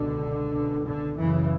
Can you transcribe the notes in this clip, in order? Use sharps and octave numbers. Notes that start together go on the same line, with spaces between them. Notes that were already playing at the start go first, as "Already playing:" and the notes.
Already playing: C#2 B2 D3
C#2 B2
D3
F#2 C#3 E3